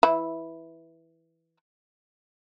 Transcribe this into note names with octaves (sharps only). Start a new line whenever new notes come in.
E3 E4